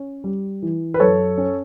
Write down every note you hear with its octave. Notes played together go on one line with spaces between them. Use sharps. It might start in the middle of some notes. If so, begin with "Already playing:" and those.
Already playing: C#4
G3
E3
B4
F#2 A4 C#5
C#4